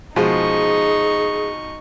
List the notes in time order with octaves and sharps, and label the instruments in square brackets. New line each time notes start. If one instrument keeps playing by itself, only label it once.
[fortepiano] B2 F3 G#3 [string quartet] D#4 C#6 [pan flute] G#4